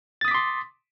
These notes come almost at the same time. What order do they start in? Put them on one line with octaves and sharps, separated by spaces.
A6 D#6 B6 D6 C6